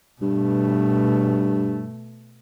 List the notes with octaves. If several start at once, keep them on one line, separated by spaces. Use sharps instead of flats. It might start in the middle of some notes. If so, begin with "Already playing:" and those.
G2 B2 A3